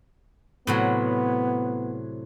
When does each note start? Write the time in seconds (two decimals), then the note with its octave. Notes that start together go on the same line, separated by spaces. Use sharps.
0.67 A2 C3 F#3 B3